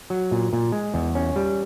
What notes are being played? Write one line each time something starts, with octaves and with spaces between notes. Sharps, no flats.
F#3
A#2
A#2
G#3
E2
C#4
G3